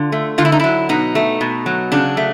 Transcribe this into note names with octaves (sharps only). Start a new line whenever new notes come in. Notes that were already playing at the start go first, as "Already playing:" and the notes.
Already playing: D3 F4
A3
D3 F4
E4
D#4
F#3 E4
B2 D#4
A3
B2
F#3
C#3 D4
A3